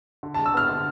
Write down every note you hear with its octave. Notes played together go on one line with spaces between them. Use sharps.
D3
G#3 A5
E6
B3 F6
D3